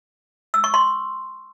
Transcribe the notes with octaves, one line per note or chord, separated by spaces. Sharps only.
E6
C#6
C6